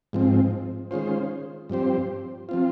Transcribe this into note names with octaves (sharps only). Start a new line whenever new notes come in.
G#2 F3 C4
D#3 G#3 C#4 F4 C5
G2 F3 C4 G4 C5
F3 C4 F4